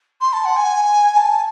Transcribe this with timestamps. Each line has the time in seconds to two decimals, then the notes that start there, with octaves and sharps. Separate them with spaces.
0.21 C6
0.33 A5
0.45 F#5
0.56 G#5
1.17 A5